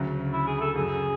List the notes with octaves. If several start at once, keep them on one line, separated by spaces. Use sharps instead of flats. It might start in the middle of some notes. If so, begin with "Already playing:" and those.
Already playing: D2 C#3 F#3
E4
G#4
A4
F#2 C#3 F#3 G#4